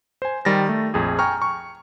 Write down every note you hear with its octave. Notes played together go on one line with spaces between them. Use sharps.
C5 G#5
D#3 G3 A6 A#6
A3
A#1 F2 G#4
G5 G#5 A#5 C#6 F6
C#6